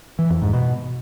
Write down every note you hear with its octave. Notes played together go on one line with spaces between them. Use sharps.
E3
F2
G#2
B2